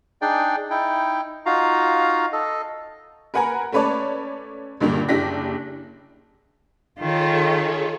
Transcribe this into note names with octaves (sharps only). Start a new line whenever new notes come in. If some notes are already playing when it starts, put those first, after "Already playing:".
D4 D#4 G#4 D5 G5
D#4 E4 G5
D#4 F4 F#4 F5 A#5
A4 D#5
A#4 B4 F#5 G#5 A#5
A3 C#4 B4 C#5 D5 A5
C#2 G2 A#2 D3 G3
F#1 D4 E4 G4 A#6 B6
D#3 F4 G#4 A4 C#5